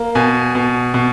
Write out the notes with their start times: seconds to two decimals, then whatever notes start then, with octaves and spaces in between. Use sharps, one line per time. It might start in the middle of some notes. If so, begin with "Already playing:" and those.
Already playing: A#3
0.15 B2 G#5
0.55 B2
0.94 B2